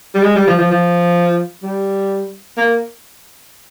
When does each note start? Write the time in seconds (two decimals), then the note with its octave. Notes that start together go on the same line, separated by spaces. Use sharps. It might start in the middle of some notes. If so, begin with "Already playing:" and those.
0.15 G3
0.23 G#3
0.36 G3
0.47 F3
0.58 F3
0.71 F3
1.63 G3
2.57 A#3